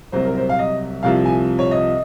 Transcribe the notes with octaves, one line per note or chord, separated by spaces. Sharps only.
C2 C3 F#3 C5
A#4
C5
F5
D#5
C2 C3 F3 F5
G#5
C#5
D#5